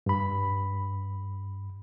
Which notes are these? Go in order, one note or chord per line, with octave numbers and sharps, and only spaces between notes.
G2 B5